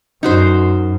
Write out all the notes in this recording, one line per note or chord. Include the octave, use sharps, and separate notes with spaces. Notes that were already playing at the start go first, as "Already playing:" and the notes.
F#2 D#4 F#4 C5